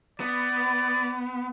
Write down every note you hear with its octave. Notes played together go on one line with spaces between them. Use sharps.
B3 D5